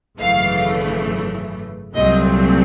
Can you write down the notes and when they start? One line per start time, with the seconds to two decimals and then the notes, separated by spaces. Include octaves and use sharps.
0.18 G#1 F#2 C#3 E3 A3 F5
1.94 C2 A#2 F#3 A3 C4 D#5